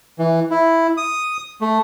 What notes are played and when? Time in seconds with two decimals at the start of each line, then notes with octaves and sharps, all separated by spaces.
0.19 E3
0.51 E4
0.97 D#6
1.61 A3